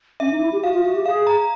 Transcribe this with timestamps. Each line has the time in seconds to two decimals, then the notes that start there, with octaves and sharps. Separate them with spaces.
0.20 C#4 E5
0.32 D#4
0.41 E4
0.52 G4
0.64 F#4 F5
0.74 F4
0.85 F#4
0.95 G4
1.06 G#4 F5
1.27 A#5